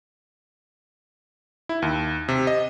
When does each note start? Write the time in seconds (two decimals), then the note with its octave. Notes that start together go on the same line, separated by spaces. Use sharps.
1.69 E4
1.82 D#2
2.28 C3
2.47 D#5